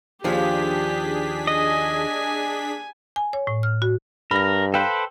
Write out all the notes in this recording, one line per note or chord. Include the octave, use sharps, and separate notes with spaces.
D#2 F3 D4 G4 G#4 B6
D#5 G#5
G#5
C#5
A2
F6
F#4
G2 A#4 B5 A#6
A4 B4 C5 F5 G5